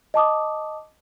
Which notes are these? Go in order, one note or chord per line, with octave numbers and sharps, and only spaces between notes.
D#5 A5 D6 D#6